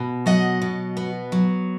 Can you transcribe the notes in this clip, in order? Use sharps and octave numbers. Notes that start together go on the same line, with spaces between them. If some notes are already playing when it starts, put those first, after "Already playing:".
Already playing: B2
F#3 D#5 F#5
B2
B3
F#3